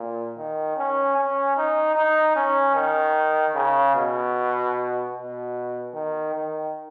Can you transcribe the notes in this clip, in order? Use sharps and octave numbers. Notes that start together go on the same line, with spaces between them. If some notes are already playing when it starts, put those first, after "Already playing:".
Already playing: A#2
D#3
C#4
C#4
D#4
D#4
C#4
D#3
C#3
B2
B2
D#3
D#3